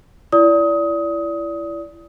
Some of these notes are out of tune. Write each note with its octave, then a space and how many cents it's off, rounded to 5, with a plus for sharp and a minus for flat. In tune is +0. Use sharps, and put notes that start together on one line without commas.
E4 +25 D5 -25 D#6 +20